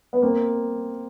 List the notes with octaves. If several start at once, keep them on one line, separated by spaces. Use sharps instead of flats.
B3
A#3 C4